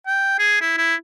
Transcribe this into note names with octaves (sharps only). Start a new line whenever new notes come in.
G5
G#4
E4
E4